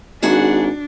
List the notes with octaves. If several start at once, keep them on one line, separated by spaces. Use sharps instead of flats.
G#1 D4 F#4 G#4 F#5